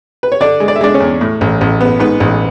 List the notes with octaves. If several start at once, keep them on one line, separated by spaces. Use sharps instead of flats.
B4
C#5
D3 D4 D5
G#3
D5
E5
G#3 D4 D5
C#4 C#5
E2
A2
A1
A1
B3
G#2 B3 B4
A1